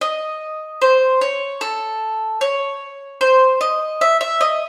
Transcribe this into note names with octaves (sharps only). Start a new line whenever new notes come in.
D#5
C5
C#5
A4
C#5
C5
D#5
E5
E5
D#5